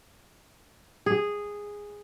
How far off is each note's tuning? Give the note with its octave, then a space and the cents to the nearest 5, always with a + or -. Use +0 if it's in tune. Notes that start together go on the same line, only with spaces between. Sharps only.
G#4 -10